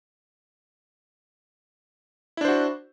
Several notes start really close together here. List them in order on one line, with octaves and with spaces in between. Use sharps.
E4 D4 C5 F#4